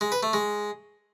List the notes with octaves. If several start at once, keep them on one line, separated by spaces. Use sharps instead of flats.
G#3
B4
A3
G#3